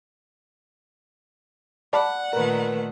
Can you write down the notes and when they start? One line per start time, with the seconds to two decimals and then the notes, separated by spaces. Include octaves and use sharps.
1.93 D5 F#5 A5 B5
2.33 A#2 D#3 A3 A#4 B4